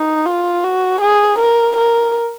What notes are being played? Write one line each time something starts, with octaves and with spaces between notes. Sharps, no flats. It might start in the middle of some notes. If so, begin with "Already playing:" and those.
Already playing: D#4
F4
F#4
G#4
A#4
A#4